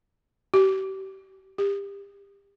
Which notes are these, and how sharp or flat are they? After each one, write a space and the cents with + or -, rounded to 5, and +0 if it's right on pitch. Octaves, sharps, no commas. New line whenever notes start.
G4 -35
G4 +30